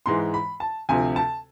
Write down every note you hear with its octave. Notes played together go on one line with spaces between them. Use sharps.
G#2 E3 G#3 C6
B5
A5
D2 C3 F3 G#5
A5